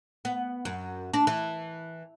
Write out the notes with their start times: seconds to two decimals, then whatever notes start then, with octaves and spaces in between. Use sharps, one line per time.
0.25 B3
0.65 F#2
1.14 D4
1.27 E3